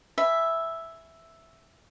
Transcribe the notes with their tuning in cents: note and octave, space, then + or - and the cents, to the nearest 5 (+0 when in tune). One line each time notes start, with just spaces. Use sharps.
E5 +0 G#5 +0 B5 +0